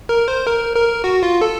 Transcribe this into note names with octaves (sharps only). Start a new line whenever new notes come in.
A#4
C5
A#4
A#4
F#4
F4
A4